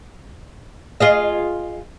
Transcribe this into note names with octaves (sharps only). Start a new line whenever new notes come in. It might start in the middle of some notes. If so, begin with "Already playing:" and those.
F4 G#4 D#5